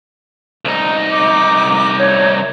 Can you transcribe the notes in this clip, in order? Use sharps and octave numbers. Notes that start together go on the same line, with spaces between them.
C2 D#4
D6
C#5